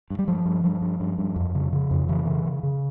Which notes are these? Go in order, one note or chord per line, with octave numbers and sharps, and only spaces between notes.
G2
G3
G2 F3
G2
G2 F3
G2
G2
G2
F2
C#3
C#3
F2
C#3 E3
C#3
C#3
C#3